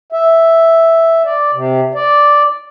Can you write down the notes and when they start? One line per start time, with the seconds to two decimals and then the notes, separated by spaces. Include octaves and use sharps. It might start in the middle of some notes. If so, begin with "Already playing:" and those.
0.12 E5
1.25 D5
1.53 C3
1.94 D5